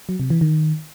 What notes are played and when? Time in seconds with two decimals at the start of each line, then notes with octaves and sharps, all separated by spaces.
0.09 F#3
0.20 C3
0.30 E3
0.41 D#3